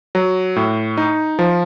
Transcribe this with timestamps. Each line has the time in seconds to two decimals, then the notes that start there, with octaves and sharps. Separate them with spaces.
0.15 F#3
0.56 A2
0.97 D#4
1.39 F3